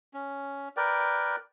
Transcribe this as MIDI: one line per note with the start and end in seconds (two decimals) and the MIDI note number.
0.14 0.68 61
0.77 1.36 70
0.77 1.36 71
0.77 1.36 74
0.77 1.36 79